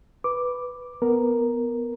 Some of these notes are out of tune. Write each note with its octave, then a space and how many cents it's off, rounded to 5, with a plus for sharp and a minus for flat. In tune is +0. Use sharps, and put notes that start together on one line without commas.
B4 +0 D6 +0
B3 +0 A#4 +0